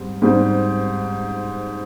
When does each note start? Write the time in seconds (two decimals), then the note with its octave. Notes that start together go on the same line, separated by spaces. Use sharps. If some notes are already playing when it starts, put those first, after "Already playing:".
Already playing: G#2 G3 C4
0.22 G#2 G3 C4